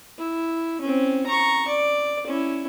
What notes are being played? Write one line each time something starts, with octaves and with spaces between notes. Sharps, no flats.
E4
C4 C#4
A#5 C#6
D5
C#4 E4